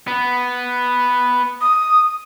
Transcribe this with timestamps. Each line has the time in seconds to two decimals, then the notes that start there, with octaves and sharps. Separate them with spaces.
0.08 B3
1.60 D#6